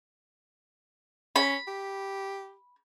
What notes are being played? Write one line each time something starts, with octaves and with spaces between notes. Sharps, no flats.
C#4 B5
G4